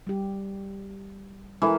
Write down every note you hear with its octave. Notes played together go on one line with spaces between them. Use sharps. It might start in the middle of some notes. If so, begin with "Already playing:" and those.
G3 G4
E3 G#3 A4 A#4